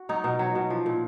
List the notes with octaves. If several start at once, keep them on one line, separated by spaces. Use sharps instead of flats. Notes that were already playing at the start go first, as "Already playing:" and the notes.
Already playing: F#4
F#3 D#4
B2
F#3
B2
F3
A#2